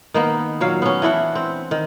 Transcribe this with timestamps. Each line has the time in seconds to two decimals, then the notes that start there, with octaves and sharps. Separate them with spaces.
0.14 D#3 A#3 B3
0.60 A#2 F#3 F5
0.82 B3 C#4
1.02 E3 D4 E4 F#5
1.35 C4
1.71 D#3